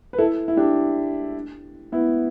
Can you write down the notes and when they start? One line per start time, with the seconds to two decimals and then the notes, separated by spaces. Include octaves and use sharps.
0.13 B4
0.18 E4 A4
0.48 E4
0.57 D4 G4
1.92 B3 E4